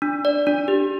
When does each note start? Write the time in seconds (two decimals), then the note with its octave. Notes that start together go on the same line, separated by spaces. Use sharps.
0.02 D4
0.25 D5
0.47 D4
0.68 G4